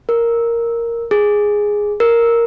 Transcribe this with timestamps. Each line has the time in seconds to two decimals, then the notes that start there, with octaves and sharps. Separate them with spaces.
0.09 A#4
1.11 G#4
2.00 A#4